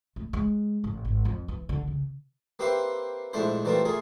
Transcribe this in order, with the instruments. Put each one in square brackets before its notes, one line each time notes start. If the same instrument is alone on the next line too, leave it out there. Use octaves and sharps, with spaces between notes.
[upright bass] A3
G#3
A1
G#1
F2
E3
D3
C#3
[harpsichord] A#3 C4 G4 B4 E5 C6
A#1 G#2 A3 D4 E4 C5
E3 G3 A3 A#3 C4 F4
A3 A#3 F4 G#4